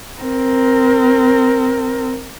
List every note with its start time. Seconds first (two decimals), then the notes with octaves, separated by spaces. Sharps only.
0.22 C4 A#4